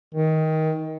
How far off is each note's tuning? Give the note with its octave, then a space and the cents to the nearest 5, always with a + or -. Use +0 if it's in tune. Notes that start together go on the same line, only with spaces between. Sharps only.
D#3 +20